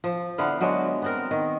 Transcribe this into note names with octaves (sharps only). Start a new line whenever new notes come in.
F3
D3 B3 E4 F5
D3 F#3 G#3 D4
B3 C4 A#4
D#3